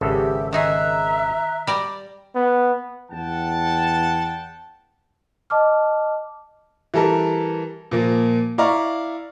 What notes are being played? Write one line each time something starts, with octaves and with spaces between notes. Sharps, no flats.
G#1 C#3 G4 A4 E5 E6
D#3 D#4 G#4 E5 A#5 F#6
G3 D5 A#5
B3
E2 F#5 G5 A5
D#5 A5 D6 F6
E3 G3 A4 A#4
A#2 F3 A#3
E4 D5 F5 A#5 C#6